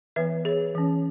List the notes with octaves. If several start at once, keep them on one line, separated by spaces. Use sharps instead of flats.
E3 B3 B4 E5
G#4 C#5
E3 C#4